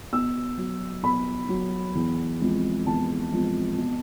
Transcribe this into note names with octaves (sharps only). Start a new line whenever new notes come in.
B2 E6
F#3
B2 B5
F#3
E2
C3 F3 G#3
E2 A5
C3 F3 G#3
B2